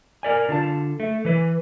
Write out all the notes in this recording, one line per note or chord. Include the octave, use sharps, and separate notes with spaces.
A#4 D5 G#5
D3 F4 A5
A3
E3 B4